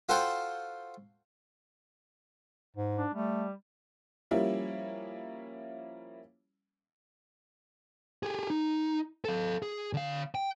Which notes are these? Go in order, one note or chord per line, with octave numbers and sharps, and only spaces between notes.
F4 F#4 A4 C5 F#5 G5
G#2
D4
G3 A3
F3 G3 A#3 C#4 E4
G4 G#4
D#4
A4 F5
G#4
D3 F5
G5